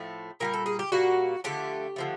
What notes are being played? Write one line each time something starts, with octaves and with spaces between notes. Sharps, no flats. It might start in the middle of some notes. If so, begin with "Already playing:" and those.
Already playing: A2 F3 A3
A#2 G3 A#3 A#4
A4
G#4
G4
A#2 G3 A#3 F#4
D3 F3 A3 G4
D3 F3 A3